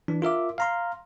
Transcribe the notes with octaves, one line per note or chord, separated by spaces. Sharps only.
E3 D4
F4 A#4 E5 D6
F5 A#5 C6